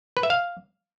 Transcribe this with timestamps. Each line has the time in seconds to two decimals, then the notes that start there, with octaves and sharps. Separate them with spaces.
0.17 B4
0.23 E5
0.30 F5